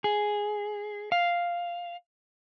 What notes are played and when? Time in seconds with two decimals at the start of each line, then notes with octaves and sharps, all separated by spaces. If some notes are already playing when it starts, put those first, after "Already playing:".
0.04 G#4
1.12 F5